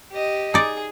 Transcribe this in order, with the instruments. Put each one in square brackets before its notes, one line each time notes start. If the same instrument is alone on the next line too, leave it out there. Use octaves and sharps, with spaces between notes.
[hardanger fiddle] G4 D#5
[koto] D#4 D5 [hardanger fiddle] G#4